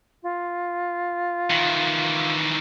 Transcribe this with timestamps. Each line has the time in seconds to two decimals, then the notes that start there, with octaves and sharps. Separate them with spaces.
0.23 F4
1.50 D#3 E3